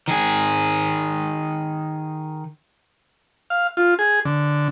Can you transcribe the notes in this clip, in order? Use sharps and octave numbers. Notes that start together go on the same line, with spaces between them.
D#3 G#4
F5
F4
G#4
D3